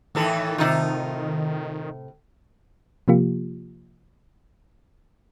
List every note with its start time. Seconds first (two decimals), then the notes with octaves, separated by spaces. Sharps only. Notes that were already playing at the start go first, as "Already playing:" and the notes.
0.15 A2 D#3 E3 A4
0.58 A2 C3 D#4 F4
3.08 C3 F3 A#3 F4 G4